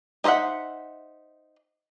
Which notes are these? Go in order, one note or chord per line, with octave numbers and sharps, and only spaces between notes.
D#4 C5 D#5 E5 F#5